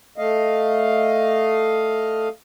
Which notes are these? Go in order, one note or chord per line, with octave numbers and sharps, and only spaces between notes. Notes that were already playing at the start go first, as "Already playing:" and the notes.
A3 D#5 F5